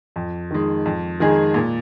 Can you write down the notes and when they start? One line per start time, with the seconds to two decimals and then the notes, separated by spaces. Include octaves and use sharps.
0.16 F2
0.51 D#3 G#3
0.86 F2
1.20 D#3 G#3 D#4 G#4
1.54 A#2